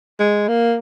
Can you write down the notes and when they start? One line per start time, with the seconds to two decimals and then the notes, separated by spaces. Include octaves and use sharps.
0.20 G#3
0.48 A#3